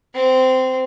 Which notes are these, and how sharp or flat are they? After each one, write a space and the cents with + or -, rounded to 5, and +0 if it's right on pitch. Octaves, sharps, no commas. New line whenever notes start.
C4 -15